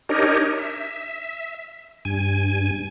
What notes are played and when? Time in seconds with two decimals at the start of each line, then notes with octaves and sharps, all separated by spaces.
0.09 D4 D#4 G4 A#4 C#5 D#5
0.56 E5
2.05 G2 G#5